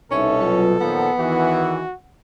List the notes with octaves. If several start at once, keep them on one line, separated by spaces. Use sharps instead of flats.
C2 B2 C#4 D#4 A4 E5
F#3 F4 B4
A#2 D#3 F3 B3 F#5
E2 D#3 E3 F#4